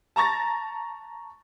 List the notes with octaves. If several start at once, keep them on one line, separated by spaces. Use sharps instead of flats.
A5 A#5 C#6 A6 A#6